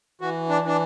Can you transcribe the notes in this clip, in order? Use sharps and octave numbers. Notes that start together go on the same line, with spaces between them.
E3 F#4
D4
E3 D4